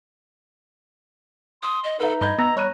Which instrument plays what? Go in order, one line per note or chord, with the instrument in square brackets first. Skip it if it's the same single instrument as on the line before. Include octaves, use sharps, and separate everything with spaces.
[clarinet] C6 [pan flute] D#6
[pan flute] D#5
[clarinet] D#4 [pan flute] A4 [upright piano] B4 E5
[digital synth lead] G2 [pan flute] D#5 [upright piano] B5 G6 G#6
[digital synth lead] B3 [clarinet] A#5 [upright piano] E6 A#6
[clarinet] G3 [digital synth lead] C#5 [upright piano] A#5 F#6 D#7